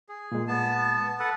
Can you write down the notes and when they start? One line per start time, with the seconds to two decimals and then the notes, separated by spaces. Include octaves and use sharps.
0.09 G#4
0.32 A#2 G#3
0.48 B3 A5
1.20 A4 B4 F#5